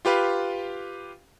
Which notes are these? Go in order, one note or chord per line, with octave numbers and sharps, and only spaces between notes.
F4 G4 B4 F5